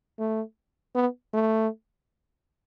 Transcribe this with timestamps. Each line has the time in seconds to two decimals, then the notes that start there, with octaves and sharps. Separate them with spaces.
0.19 A3
0.95 B3
1.34 A3